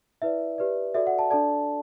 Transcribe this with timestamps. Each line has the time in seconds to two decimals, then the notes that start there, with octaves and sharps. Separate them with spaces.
0.22 E4 B4 D5 E5
0.58 G4 B4 D5
0.94 F#4 A4 D5 E5
1.07 F#5
1.19 A5
1.31 D4 A4 D5 A5